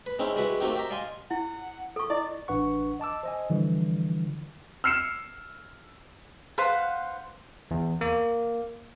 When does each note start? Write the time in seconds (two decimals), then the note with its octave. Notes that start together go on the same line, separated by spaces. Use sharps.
0.06 B4
0.19 G#3 C4 C#4 D#4 E4
0.36 G3 G#3 E4 F#4 B4
0.60 A3 A#3 C4 D#4 F#4 G4
0.76 G4 E5 A#5
0.90 D5 D#5 F5 G#5 C6
1.31 E4 F#5
1.96 A4 C#6
2.10 E4 D5 D#5
2.48 A1 D4 B4 F#5 C#6
3.00 D#5 A5 D6 E6
3.23 C5 D#5 G#5
3.50 D3 E3 F3 G3
4.84 E6 F6 C7 C#7 E7
6.58 B4 C5 F5 F#5
7.71 E2
8.01 A#3